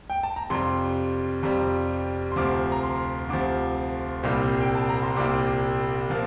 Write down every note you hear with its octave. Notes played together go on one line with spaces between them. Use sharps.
G5
A5
A#5
F2 C3 G3 C6
F2 C3 G3
C6
D2 C3 F3 D6
A#5
C6
D2 C3 F3 D6
C2 A#2 G3 C4
G5
A5
A#5
C6
C2 A#2 G3 C4 D6
A#2 F3 A#3